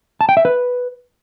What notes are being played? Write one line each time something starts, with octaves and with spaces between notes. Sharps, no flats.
A5
G5
E5
B4